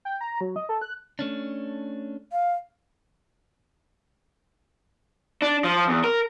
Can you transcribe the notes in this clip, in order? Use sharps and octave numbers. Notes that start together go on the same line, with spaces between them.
G5
A#5
F#3
D#5
A4
F#6
A3 C#4 D4
F5
D4
F3
E2
A#4